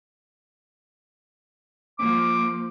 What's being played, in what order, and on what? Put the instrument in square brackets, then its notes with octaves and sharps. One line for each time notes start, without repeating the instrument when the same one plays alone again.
[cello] F3 A#3 [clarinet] D6